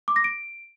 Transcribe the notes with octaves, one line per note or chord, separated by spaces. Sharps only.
D6
A#6
D7